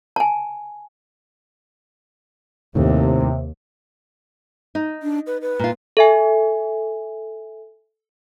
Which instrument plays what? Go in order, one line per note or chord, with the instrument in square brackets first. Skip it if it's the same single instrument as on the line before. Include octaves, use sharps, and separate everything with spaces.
[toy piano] G#5 A5
[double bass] D#2 [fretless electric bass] A2 D#3 [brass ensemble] C3
[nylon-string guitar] D#4
[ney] D4
B4
B4
[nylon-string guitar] A#2 F4
[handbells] A4 E5 G#5